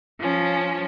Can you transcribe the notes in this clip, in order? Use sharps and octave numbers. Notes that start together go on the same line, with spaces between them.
F3 C#4